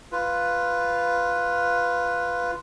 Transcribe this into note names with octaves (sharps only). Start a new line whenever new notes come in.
F4 B4